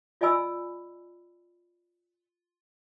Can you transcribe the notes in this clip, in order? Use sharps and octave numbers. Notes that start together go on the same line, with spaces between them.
F4 D5 D#5 G#5 B5 E6